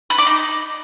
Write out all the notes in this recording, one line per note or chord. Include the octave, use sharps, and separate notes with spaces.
B4
D5
D#4